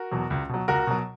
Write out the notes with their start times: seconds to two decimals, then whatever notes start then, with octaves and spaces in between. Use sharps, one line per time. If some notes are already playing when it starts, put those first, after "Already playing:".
Already playing: F#4 A#4
0.12 E2 B2 F#3
0.30 C#2
0.49 B2 F#3
0.68 C#2 F#4 A#4
0.87 B2 F#3